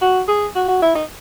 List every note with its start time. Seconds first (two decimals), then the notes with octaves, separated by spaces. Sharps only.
0.01 F#4
0.28 G#4
0.55 F#4
0.68 F#4
0.82 E4
0.95 D#4